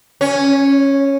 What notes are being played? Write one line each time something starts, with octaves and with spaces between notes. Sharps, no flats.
C#4